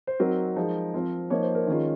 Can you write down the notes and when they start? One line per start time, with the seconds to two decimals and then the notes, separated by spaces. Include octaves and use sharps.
0.07 C5
0.19 F#3 C4 D#4 A#4
0.56 F3 G#3 D#4
0.94 F3 C4 F4
1.30 F3 A#3 D#4 C#5
1.43 C5
1.55 A#4
1.67 D#3 G#3 C#4 F4